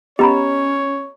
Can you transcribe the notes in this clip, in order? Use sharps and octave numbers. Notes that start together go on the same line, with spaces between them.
B3 C#4 G4 C#5 D#5 A#5 B5